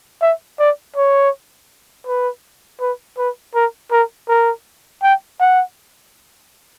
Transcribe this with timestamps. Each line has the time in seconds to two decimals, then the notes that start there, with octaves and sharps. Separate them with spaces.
0.22 E5
0.59 D5
0.96 C#5
2.07 B4
2.81 B4
3.18 B4
3.55 A#4
3.92 A#4
4.29 A#4
5.03 G5
5.40 F#5